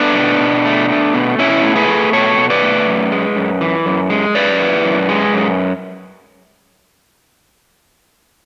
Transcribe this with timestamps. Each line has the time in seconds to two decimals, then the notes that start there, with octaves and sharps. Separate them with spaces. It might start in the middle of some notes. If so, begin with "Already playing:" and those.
Already playing: A3 B3 D4
0.16 B2
0.40 B2
0.65 A3
0.89 A3
1.14 B2
1.39 B2 C#4 E4
1.63 A3
1.76 G#4 B4
1.88 A3
2.13 B2 A4 C#5
2.38 B2
2.50 B4 D5
2.62 A3
2.87 F#2
3.11 G#3
3.36 F#2
3.61 E3
3.86 F#2
4.10 G#3
4.35 F#2 B4 D5
4.59 E3
4.85 F#2
5.09 G#3
5.34 F#2